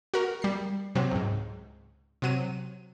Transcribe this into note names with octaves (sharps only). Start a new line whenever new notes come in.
F#4 A#4
G3 C7
C3 F#3 C4
C#2 G#2
C3 F#3 D#7